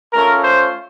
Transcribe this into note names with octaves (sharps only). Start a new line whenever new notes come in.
A3 C#4 F4 A#4
C5